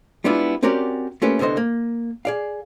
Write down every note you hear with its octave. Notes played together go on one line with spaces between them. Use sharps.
G3 G#3 B3 D4 E4 F4
C4 C#4 F#4 G4 A#4 D5
A3 A#3 C#4 F4 G4 B4
C2 D3 B3 C5 D#5
A#3
G#4 D5 F5